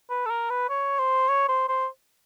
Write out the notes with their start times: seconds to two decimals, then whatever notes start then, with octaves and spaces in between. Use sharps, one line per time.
0.10 B4
0.26 A4
0.30 A#4
0.50 B4
0.69 C#5
0.99 C5
1.29 C#5
1.49 C5
1.69 C5